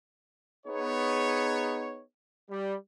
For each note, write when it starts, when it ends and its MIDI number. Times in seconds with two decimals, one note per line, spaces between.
0.66 2.01 59
0.66 2.01 63
0.66 2.01 68
0.66 2.01 73
2.49 2.74 55